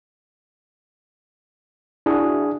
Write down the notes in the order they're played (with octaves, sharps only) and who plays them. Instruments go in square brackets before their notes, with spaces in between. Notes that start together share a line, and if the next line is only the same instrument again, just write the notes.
[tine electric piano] D4 G#4 [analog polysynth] E4 F#4